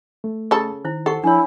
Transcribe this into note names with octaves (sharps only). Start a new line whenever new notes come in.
A3
C#3 A4 A5
D#3 E4 C5
D#4 A4 F#5 C#6
F3 D4 E4 C#5